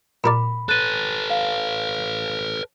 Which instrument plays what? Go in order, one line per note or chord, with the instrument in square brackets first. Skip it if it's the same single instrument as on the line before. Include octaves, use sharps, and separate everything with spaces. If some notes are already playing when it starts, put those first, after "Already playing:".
[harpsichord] A#2 A#4 D5 [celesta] B5
[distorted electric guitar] A4 B4 [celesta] F#6 A6 D#7
[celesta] F5